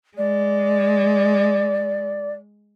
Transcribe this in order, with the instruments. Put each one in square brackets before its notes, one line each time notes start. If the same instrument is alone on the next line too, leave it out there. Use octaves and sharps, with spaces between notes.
[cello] G#3 [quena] D5